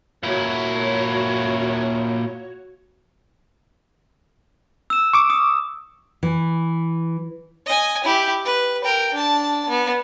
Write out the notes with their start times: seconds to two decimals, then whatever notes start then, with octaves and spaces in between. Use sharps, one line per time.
0.23 A#2 E4 F#4 C#5
4.90 E6 E7
5.13 C#6 D6
5.30 D#6
6.23 E3
7.66 D#5 G#5
8.04 E4 G4
8.45 B4
8.84 A#4 G5
9.14 D4 A5
9.69 B3